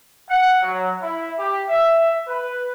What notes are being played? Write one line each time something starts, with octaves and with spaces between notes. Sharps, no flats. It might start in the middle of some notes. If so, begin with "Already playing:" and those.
F#5
F#3
E4
G4
E5
B4